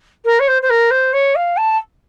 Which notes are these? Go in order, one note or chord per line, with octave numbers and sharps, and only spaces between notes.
A#4
C#5
C5
C5
A#4
C5
C#5
F5
A5